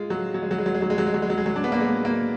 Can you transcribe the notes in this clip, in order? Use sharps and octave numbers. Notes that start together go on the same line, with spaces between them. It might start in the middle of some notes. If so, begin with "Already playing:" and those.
Already playing: G#3 F4
F#3
F#3
G#3
F#3
G#3
F#3
G#3
F#3
G#3
F#3
G#3
F#3
G#3
F#3
G#3
F#3
D4
B3
A#3
G#3
A#3